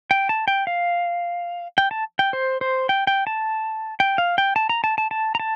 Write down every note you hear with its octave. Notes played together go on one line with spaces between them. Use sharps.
G5
A5
G5
F5
G5
A5
G5
C5
C5
G5
G5
A5
G5
F5
G5
A5
A#5
A5
A5
A5
A#5
A5